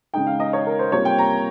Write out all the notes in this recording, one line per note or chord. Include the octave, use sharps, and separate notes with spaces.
C#3 G#3 D#4 G5
F5
D#5
C#5
A#4
C5
C3 G3 A#3 F4 C#5
G5
A#5